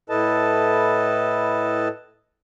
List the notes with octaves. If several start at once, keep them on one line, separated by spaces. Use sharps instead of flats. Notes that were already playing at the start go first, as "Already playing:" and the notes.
A2 E4 A4 B4 D#5 A5